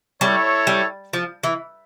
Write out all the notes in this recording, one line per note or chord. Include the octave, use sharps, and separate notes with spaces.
G3 E4 A4 C#5
G3
F3
E3